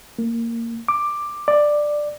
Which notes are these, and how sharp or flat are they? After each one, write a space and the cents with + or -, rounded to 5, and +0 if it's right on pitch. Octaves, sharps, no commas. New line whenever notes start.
A#3 -15
D6 +10
D5 +10